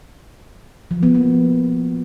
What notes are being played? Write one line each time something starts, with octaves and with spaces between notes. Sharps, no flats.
F3
B3
A#3